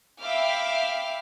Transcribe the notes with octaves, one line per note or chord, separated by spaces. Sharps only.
E5 F5 G5 B5 D6 F6